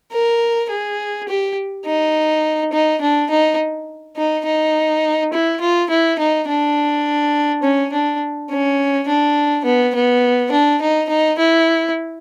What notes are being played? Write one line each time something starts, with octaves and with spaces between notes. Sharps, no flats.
A#4
G#4
G4
D#4
D#4
D4
D#4
D#4
D#4
E4
F4
E4
D#4
D4
C#4
D4
C#4
D4
B3
B3
D4
D#4
D#4
E4